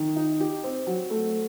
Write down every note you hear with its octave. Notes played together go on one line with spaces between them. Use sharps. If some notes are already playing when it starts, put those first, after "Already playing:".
Already playing: D#3
D#4
G4
C4
F#3
A3